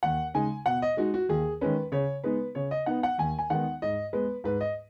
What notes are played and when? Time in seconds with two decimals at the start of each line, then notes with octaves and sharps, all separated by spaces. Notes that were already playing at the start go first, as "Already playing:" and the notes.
0.03 D#2 F#5
0.34 C#3 G#3 D#4 G#5
0.66 B2 F#5
0.82 D#5
0.97 G#3 D#4 F#4
1.14 F#4
1.29 D#2 G#4
1.61 D#3 G#3 C#4 B4
1.92 C#3 C#5
2.24 G#3 B3 D#4 B4
2.55 C#3 C#5
2.71 D#5
2.86 B3 D#4 F#5
3.03 F#5
3.18 D#2 G#5
3.39 G#5
3.50 D#3 G#3 B3 D#4 F#5
3.82 G#2 D#5
4.13 G#3 B3 B4
4.44 G#2 B4
4.61 D#5